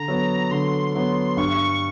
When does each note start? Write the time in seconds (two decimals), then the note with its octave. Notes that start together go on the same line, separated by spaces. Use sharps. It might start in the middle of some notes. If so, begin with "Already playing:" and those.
Already playing: D3 A#5
0.08 F#3 B3
0.51 D3 C6
0.94 F#3 B3 C6
1.37 G2 C#6